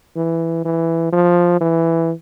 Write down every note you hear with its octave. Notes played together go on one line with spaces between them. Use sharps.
E3
E3
F3
E3